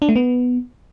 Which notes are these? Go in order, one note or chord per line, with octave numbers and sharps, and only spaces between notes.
D4
A3
B3